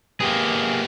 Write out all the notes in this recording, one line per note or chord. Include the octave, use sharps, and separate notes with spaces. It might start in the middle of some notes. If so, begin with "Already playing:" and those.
A#3 B3 G4 G#4